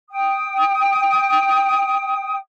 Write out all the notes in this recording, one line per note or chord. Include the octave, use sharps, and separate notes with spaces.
G5 D#6